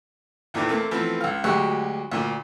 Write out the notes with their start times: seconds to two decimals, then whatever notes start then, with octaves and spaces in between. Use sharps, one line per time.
0.54 E2 A#2 D#3 E3 A4
0.69 A3 A#3 C4
0.91 E3 F3 A3 B3 C4
1.21 C#2 F5
1.44 D2 F#3 G#3 G4 C#6 F#6
2.11 D2 A#2